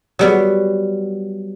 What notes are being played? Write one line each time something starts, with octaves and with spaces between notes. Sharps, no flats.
F#3 G3 B3